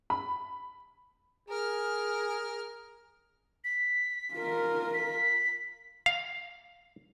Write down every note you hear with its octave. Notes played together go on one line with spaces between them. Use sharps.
B5
G#4 A#4 F6
B6
F4 A#4
B6
F5